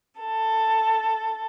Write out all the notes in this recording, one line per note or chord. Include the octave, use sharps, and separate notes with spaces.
A4